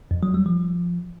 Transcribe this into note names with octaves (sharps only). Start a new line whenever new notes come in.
F2
F#3
G3
F3